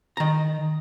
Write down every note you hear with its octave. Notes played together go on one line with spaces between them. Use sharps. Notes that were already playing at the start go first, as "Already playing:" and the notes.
D#3 A#5